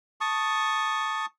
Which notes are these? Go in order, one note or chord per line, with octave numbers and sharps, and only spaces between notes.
A5 C#6 D#6